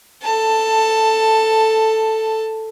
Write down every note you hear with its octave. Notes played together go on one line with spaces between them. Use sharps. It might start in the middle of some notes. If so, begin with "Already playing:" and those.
A4 A5